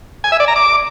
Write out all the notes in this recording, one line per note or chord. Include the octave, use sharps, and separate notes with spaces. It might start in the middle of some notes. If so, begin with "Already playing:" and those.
G#5
E5
D5
A#5
D6